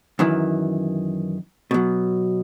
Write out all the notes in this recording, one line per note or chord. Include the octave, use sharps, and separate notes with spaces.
F#2 D#3 E3
B2 F#3